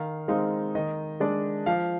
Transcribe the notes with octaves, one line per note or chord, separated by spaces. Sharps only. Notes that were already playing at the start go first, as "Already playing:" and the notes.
Already playing: D#3 F5
G#3 C4 D#4 F5
D#3 D#5
G#3 D4 D5
F3 F5